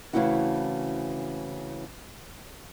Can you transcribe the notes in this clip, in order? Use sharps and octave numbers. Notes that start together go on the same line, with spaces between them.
C#3 E3 A3 C4 E4 F#4